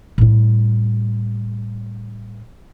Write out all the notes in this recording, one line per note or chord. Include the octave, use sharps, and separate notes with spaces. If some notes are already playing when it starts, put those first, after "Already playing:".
A2 G3